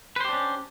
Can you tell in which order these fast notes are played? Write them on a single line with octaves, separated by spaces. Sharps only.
B4 C5 G4 D4 C#4